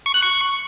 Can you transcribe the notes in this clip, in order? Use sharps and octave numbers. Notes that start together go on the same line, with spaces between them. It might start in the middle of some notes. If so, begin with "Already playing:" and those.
C#6
F#6
C#6